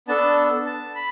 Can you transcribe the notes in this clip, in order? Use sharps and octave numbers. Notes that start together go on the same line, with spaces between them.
B3 D4 A4 A5
A5
B5